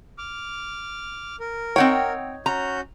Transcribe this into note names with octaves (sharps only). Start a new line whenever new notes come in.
D6 F6
A#4
C4 D#4 C#5 F#5 G5
C#4 F#4 A#5 G6